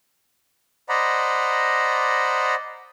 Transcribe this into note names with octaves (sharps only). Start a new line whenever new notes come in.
C5 D5 D#5 F#5 A#5 B5